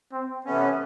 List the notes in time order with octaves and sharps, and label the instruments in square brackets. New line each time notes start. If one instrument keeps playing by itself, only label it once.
[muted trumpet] C4
[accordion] C3 E3 A3 C#4 [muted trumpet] B3